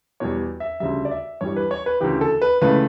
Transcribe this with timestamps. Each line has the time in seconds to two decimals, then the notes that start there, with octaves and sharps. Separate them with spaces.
0.20 E2 B2 G3 C#5
0.60 E5
0.80 D2 C#3 G3 E5
1.05 D5
1.11 E5
1.41 G2 E3 G3 C#5
1.56 B4
1.71 C#5
1.86 B4
2.00 D2 C#3 E3 G4
2.21 A4
2.42 B4
2.61 C#2 C#3 E3 A3 B4